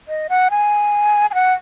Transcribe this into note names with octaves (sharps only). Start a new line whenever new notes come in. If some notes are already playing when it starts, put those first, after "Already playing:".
D#5
F#5
G#5
G#5
F#5